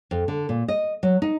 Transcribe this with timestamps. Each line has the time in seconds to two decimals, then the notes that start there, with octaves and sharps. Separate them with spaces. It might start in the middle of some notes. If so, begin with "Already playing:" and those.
0.11 F2
0.28 D3
0.49 A#2
0.68 D#5
1.03 F#3
1.22 D#4